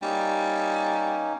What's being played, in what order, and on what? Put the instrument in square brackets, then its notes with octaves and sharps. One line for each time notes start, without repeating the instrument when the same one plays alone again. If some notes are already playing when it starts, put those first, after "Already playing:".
[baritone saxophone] G3 [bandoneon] A#3 C#4 D#4